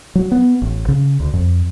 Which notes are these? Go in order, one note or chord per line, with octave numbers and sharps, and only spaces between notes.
F#3
B3
A1
C#3
D2
F2